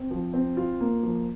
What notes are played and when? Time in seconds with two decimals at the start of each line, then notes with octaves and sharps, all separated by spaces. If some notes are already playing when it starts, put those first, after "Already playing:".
Already playing: C4
0.11 F3
0.34 C4
0.57 F4
0.81 A#3
1.03 F3